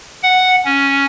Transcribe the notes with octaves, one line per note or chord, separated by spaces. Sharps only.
F#5
C#4